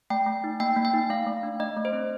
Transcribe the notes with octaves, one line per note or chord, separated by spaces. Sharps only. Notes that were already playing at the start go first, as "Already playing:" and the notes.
A3 G5
A3
D#4
A#3 G5
A#3
G5
D#4
A3 F5
A3
D4
A3 D#5
A3
C5
C4